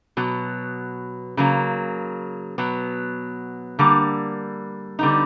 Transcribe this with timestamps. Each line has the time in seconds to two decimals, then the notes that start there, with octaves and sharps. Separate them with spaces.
0.17 B2 F#3 B3
1.37 C#3 F#3 A#3
2.58 B2 F#3 B3
3.79 D3 G3 A#3
4.99 D3 G3 B3 D#4